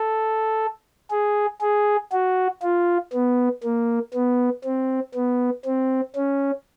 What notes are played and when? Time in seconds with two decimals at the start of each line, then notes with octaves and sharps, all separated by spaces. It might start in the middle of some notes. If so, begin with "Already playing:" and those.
Already playing: A4
1.11 G#4
1.61 G#4
2.12 F#4
2.62 F4
3.13 B3
3.64 A#3
4.14 B3
4.64 C4
5.15 B3
5.65 C4
6.16 C#4